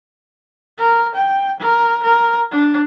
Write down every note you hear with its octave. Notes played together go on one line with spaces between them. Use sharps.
A#4
G5
A#4
A#4
D4